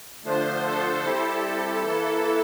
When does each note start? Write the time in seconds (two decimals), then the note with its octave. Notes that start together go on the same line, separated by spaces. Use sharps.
0.24 D3 F3 A3 D4 F4 C5
0.64 A4
1.03 G3 C4 E4 G4
1.44 A4
1.83 E3 A#3 E4 A4